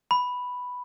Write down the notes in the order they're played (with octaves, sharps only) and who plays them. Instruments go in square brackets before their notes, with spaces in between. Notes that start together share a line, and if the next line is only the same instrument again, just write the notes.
[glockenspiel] B5